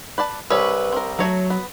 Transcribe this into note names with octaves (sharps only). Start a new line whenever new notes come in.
B4 D5 A5
C2 G#4 B4 C#5
C4 A#4
F#3 A3 C#5 A#5
B3